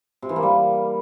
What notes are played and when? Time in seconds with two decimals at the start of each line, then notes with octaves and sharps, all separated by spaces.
0.22 C3
0.29 E3
0.36 A#3
0.43 G3